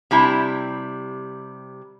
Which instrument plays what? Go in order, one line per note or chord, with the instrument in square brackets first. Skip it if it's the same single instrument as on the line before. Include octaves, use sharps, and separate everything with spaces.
[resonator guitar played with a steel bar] C3 G3 E4 A5